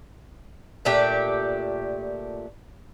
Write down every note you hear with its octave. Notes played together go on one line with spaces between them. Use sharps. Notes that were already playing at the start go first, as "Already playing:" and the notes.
A#2 A3 D4 G4